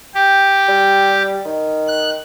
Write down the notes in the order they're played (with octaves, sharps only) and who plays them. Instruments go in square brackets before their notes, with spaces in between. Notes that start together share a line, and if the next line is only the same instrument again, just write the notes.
[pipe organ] G4
[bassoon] G3
D#3
[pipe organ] F#6